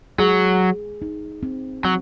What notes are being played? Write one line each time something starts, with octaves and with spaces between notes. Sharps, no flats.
F#3 G#4
G#4
D#4
C4
F#3 C4